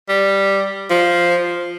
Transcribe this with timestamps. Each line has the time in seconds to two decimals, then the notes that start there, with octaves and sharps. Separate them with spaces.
0.09 G3
0.90 F3